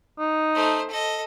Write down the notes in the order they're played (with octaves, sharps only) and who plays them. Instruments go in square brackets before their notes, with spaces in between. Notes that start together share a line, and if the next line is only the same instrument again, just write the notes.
[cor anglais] D#4
[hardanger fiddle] A3 C5
A4 D#5